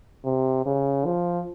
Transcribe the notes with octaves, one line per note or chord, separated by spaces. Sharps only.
C3
C#3
F3